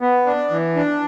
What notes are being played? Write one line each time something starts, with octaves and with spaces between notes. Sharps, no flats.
B3
D4
E3
D4